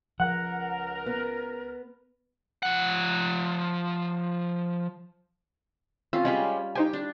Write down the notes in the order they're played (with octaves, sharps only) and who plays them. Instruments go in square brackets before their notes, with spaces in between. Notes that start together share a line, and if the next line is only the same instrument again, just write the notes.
[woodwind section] C#2 A#4 [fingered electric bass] F3 [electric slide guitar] F#5
[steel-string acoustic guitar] B3
[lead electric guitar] F3 F#5
[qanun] C4 C#4 F4 [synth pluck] E6
[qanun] G3 F4 B5 [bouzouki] G#3 C#4 G4
[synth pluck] D#4 C5 G#5 [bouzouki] G4
[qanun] D4